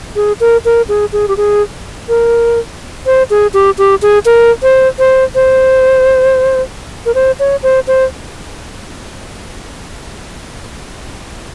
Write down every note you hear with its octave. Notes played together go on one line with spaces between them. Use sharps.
G#4
A#4
A#4
G#4
G#4
G4
G#4
A#4
C5
G#4
G4
G4
G#4
A#4
C5
C5
C5
A#4
C5
C#5
C5
C5